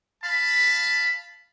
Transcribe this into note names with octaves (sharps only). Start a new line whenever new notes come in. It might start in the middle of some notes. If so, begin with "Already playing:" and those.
F5 A5 B5